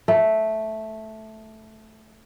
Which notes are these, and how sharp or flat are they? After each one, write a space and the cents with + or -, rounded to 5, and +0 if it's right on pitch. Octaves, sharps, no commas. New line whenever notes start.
A3 -5